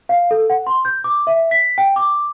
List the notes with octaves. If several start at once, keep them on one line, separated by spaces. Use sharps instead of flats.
F5
A4
F#5
C6
G6
D6
E5
B6
G5
D6